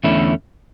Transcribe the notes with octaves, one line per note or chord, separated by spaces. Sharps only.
E2 D3 A3 C#4 E4